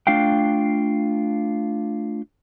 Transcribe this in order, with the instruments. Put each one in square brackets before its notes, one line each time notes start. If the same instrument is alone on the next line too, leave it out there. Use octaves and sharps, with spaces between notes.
[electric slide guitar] A3 D4 F4 F5 G5